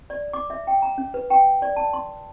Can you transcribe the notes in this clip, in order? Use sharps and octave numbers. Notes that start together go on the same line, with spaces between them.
D5
D6
E5
G5
A#5
C#4
B4
G5
D5
A5
C6